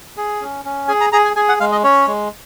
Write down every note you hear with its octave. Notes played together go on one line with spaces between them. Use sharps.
G#4
C#4
C#4
G#4 G#5
A#5
G#4 A#5
G#5
G#4 G#5
F#5
G#3 F5
D#5
C#4 C#5
G#3